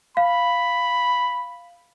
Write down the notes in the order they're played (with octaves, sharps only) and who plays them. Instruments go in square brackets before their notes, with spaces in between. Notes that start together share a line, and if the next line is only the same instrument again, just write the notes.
[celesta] F5 [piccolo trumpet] B5